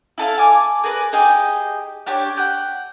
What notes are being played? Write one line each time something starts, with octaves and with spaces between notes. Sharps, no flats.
E4 A4 D#5 F5
G#5 D6
G#4 A#4 B4 D5
D#4 G4 G#4 D#5
D4 G4 C#5
F#5 G5